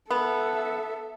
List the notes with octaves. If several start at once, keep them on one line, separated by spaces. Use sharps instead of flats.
B3 A4 E5